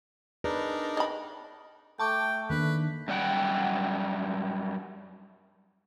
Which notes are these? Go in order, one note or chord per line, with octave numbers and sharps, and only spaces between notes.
D4 D#4 G#4 A#4 B4 D5
D#5 B5
A3 G5 A5 C#6 D6
D#3 A#3 D4 B4
F#2 G3 F#5 G5